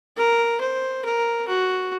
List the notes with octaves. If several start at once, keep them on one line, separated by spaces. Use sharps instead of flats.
A#4
C5
A#4
F#4